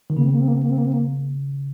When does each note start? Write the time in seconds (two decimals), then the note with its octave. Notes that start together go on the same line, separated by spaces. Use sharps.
0.10 D#3
0.17 C#3 A#3
0.25 C4
0.32 A#3
0.40 C4
0.48 A#3
0.55 C4
0.63 A#3
0.70 C4
0.78 A#3
0.86 C4
0.93 A#3